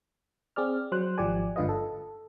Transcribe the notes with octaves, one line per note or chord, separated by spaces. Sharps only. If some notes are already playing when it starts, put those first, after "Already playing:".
C4 G#4 D5 F6
F#3 C5 F#6
G#1 F3 G4 D5 G#5
G1 G#2 D3 F4 B4 D#5
A4